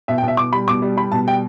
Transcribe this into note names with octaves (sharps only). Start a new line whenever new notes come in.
B2 E5
G5
B2
E5
B2 D6
G3 B5
B2 D6
G3
G3 B5
B2 A5
G3 G5